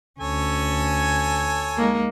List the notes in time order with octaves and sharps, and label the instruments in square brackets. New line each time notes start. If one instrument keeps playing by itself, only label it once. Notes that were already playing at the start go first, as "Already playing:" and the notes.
[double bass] D2 [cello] C#4 [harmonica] A4 C#5 G#5
[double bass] G#3 [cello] A#3 D#4